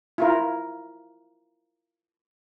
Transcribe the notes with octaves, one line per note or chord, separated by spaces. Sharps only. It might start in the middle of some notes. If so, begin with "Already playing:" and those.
E4 F4 A#4